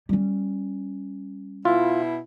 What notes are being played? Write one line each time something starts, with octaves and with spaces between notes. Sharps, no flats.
G3 C#4
B2 E4 F4